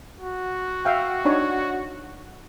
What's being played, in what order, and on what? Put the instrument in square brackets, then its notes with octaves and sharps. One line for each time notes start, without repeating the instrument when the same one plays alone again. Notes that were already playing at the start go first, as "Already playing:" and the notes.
[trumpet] F#4
[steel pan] E5 F5 G5
D4 D#4 C#5